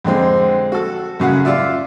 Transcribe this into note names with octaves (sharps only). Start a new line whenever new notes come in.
F2 D3 G#3 C4
F#4 A4
F#2 C#3 F#3 F#5
F4 D5 E5